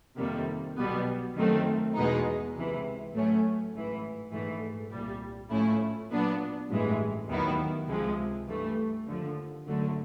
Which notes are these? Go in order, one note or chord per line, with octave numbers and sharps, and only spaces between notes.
F2 C3 D#3 G3 A#3
B1 B2 G3 B3
F#2 D#3 F#3 A3 C4
E2 B2 G#3 B3 D#4
C#2 C3 E3
A2 F#3 A3 C#4
A1 G#2 E3
A#1 G#2 E3 A3
C2 A#2 G3
A2 F3 A3 C#4 E4
A#2 F#3 B3 D4
A1 G2 E3 G#3
D#2 D#3 F#3 B3 E4
C#2 C3 F3 G#3
G2 E3 A3
D#2 D3 F3
G#1 F#2 D3 F#3 A3